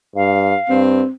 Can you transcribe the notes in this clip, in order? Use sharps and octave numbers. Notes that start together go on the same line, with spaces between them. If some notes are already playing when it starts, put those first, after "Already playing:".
G2 F5
G2 C4